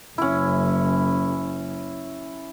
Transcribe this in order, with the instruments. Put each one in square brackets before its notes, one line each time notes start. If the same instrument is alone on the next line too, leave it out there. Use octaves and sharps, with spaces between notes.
[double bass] F#1 [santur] C#4 E4